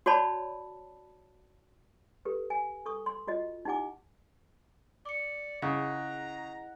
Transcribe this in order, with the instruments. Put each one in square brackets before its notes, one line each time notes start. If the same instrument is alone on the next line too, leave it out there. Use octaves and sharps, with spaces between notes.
[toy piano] F#4 C#5 D5 A5 B5
G4 A4 B4
G#5
A4 C#6 D#6
C6
F4 F#4 D#5
D#4 E4 G4 F#5 G#5 D6
[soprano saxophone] D5 [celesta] D6 C#7
[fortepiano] C#3 [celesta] E4 G#4 D#5 [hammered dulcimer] F#5 [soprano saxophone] A#5